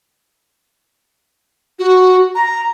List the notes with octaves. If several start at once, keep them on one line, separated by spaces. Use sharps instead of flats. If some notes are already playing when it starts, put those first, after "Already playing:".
F#4
A#5